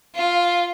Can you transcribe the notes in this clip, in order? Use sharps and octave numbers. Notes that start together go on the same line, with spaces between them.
F4